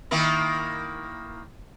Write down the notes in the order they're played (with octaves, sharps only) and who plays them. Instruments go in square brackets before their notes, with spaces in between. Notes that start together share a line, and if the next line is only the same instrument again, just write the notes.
[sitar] D#3 A#3 E4